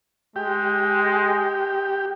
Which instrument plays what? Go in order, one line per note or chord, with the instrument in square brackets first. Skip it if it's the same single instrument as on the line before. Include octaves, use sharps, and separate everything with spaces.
[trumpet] G#3 [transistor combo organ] G4